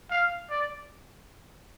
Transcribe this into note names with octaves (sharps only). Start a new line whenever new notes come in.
F5
D5